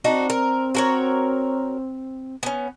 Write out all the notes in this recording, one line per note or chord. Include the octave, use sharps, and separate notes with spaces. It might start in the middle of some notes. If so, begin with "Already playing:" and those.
C4 D4 D#4 F#4
A#4
F#4 A#4 C#5
B3 C#4